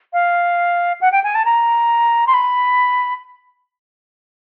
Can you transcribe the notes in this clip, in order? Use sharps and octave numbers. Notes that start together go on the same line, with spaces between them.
F5
F#5
G5
G#5
A5
A#5
C6
B5